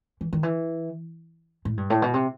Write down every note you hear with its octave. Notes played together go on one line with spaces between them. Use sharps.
E3
D#3
E3
A2
G2
A2
B2
C3